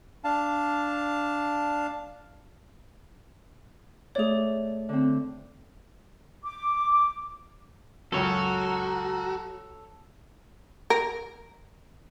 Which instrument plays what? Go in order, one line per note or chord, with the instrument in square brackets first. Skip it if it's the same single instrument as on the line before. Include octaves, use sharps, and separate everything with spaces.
[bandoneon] D4 F5 A5
[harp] A3 D5 [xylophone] G#4 C#5
[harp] D3 C4
[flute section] D6
[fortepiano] C#2 F#2 [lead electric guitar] F#4 [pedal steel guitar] A4 C#5 [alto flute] A#5
[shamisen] A#4